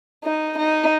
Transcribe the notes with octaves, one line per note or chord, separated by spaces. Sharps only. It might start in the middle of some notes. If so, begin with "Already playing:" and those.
D#4
D#4